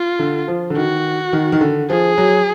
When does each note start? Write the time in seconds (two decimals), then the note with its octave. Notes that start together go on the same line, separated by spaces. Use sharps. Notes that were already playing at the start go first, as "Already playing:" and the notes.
Already playing: F4
0.19 D3
0.48 F3
0.70 D3
0.76 D#3 F#4
1.33 D#3
1.52 D#3
1.61 D3
1.90 F3 G#4
2.18 F#3